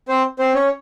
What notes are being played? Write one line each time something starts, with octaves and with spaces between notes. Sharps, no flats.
C4 C5
C4 C5
C#4 C#5